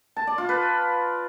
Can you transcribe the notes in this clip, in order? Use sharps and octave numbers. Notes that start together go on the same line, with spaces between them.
A5
D5
F4
B4